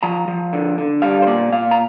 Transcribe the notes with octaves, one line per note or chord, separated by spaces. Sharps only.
F3 A#5
F3
D3
D3
G3 F5
C5
A#2 D5
A#2 F5
A#5